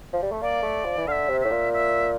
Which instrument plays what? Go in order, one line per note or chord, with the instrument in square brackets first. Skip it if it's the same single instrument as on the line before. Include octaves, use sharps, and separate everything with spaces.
[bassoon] F3
G3
A3
[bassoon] A#3 [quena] D5
[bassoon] A3
F3
E3
[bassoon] D3 [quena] E5 F5
[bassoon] C3
[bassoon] A2 [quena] E5
[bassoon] A#2
[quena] E5